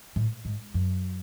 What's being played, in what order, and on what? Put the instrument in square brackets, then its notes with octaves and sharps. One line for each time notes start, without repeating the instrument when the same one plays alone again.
[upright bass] A2
G#2
F#2